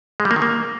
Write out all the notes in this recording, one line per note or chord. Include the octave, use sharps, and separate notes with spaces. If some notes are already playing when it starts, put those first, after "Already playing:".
G#3
G3
A#3
D#3
A#3